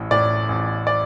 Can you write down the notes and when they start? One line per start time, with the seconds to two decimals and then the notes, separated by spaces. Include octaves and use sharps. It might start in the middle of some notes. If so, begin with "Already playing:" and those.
Already playing: A1 A2
0.11 A2 D5
0.49 A1
0.87 D5